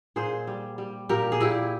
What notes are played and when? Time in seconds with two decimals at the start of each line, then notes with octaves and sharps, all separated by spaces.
0.16 A#2 G#4 C5
0.47 G3
0.78 G3
1.09 A#2 G4 A#4
1.32 G#4
1.40 A#2 E4 G4